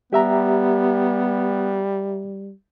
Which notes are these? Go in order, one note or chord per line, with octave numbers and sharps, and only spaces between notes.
G3 B3 G4 E5 A#5